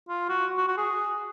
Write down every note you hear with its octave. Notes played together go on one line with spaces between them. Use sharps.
F4
F#4
F#4
F#4
G#4